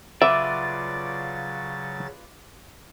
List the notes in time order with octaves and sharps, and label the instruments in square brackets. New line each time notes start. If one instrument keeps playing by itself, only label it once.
[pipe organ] C#3 F#3 A6 [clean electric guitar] F4 B4 D5 [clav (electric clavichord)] E5 [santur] D6